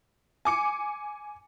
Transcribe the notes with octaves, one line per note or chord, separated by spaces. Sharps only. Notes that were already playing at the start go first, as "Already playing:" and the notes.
G#5 D6 C#7